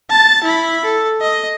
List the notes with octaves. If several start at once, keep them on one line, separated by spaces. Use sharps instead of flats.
A5 A6
E4 B5
A4
D#5